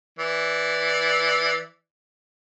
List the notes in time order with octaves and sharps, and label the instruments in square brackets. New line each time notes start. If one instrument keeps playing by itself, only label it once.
[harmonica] E3 D5